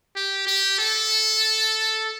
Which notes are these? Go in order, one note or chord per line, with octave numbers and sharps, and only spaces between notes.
G4
G4
A4